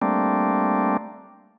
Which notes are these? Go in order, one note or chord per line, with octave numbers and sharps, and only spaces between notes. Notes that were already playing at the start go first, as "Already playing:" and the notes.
G3 A3 A#3 C4 D4